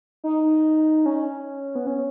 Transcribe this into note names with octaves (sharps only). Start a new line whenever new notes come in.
D#4
C#4
B3
C#4